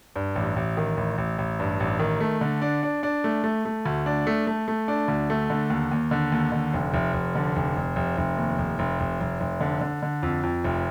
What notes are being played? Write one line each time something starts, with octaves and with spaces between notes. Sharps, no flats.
G2
A1
A1
D#3
A1
A1
A1
G2
A1
D#3
A3
D3
D4
D4
D4
A3
A3
A3
D2
D4
A3
A3
A3
D4
D2
A3
D3
D#2
D#2
D3
D#2
D3
F1
F1
F1
D3
F1
F1
F1
F1
D#2
F1
F1
F1
F1
F1
D3
D3
D3
F2
F2
F1